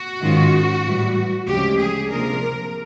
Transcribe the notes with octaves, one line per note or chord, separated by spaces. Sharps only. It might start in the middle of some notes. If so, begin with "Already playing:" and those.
Already playing: F#4
G#2 D#3 G#3 C#4 F4
A2 E3 G3
D2 C#3 F3 G#3 C#4 G4
G#4
C3 F3 A#3 D4 A#4